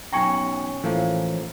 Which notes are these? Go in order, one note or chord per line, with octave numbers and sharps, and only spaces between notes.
B1 C#4 G5 G#5 A#5 C#6 C#7
A2 E3 F3 A#3